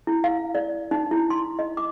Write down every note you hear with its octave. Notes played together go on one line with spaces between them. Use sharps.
E4
F5
D5
D#4
E4
C6
D#5
D6